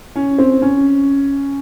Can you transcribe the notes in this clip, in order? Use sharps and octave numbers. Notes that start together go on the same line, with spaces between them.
C#4
C4
C#4